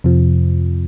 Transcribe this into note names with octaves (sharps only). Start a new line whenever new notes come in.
F2 C3 F3